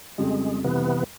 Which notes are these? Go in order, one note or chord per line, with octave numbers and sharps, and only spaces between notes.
F2 C#3 G3 G#3
C3 E3 B3